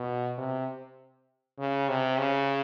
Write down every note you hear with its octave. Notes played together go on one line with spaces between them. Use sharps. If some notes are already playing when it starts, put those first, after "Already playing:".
Already playing: B2
C3
C#3
C3
C#3